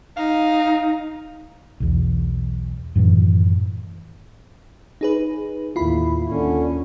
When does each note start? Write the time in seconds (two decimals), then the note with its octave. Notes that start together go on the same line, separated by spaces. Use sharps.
0.17 D#4 F5
1.80 B1 E2
2.95 F#2 A2 D#3 E3
5.01 D#4 G#4 B4
5.76 A1 D#2 E4 F4 B5
6.29 D#2 D3 C#4